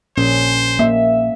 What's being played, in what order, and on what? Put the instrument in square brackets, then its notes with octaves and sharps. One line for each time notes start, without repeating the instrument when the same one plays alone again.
[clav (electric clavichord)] A#1 [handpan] C#4 [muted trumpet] C5
[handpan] A#3 [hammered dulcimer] E5